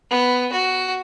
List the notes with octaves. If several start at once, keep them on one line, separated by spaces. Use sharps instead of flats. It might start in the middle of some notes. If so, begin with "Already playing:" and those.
B3
F#4